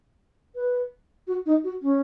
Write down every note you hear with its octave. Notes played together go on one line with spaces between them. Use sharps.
B4
F#4
D#4
F#4
C#4